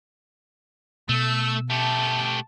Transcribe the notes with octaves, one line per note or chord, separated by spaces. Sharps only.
B2 A3 E6
A3 G4 A5